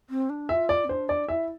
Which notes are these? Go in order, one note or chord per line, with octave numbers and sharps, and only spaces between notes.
C4
D4
F4 E5
D5
C4
D4 C5
D5
E4 E5